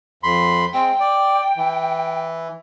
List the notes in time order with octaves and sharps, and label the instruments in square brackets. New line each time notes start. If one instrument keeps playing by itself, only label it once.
[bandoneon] F2 B5 C6
[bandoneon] G#3 C4 [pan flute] G5
[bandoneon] D5
E3